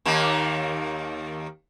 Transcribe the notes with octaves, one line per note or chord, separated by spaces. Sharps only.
D#2 D#3 A#3